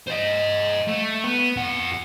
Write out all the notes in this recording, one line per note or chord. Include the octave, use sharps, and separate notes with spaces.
C5 D#5
A3
B3
F2 F#5